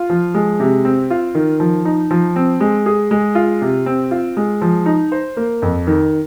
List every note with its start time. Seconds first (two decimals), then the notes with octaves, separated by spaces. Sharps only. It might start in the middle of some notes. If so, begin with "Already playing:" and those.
Already playing: F4
0.10 F3
0.34 G#3
0.60 C3
0.85 C4
1.10 F4
1.35 D#3
1.60 F3
1.85 D#4
2.11 F3
2.36 C4
2.60 G#3
2.86 G#4
3.11 G#3
3.35 F4
3.61 C3
3.86 C4
4.11 F4
4.37 G#3
4.62 F3
4.86 D#4
5.12 C5
5.37 A#3
5.62 F2
5.87 D#3